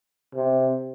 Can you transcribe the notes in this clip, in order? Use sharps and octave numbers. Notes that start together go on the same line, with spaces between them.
C3